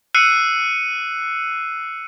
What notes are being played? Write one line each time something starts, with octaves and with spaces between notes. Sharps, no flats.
E6 F#6 C7 C#7 D#7